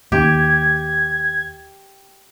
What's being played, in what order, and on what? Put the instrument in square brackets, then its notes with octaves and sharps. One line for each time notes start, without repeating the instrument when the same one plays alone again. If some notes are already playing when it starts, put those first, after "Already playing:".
[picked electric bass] D#2 [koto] G4 [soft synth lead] G#6